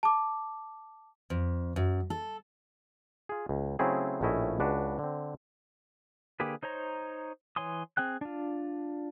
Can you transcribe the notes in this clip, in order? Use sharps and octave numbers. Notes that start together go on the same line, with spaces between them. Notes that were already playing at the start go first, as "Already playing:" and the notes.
A5 D6
F2
F#2
A4
F4 G#4
C#2
C#3 F#3 A3 C4 E4 G#4
A#1 A2 A3 C#4 E4 D#5
C#2 D4 F#4 B4
D3 C4
D3 A#3 G4 G#4 B4
D#4 C5 C#5 A#5
E3 C#5 G#5 C6 D#6
C4 G#4 G5 F#6
D4 F4